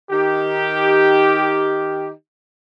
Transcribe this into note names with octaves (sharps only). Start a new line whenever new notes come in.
D#3 D#4 G4